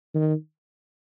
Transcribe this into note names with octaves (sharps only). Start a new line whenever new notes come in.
D#3